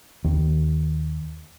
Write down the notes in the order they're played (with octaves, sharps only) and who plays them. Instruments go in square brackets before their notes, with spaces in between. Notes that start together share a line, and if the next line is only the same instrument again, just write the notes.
[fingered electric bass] D#2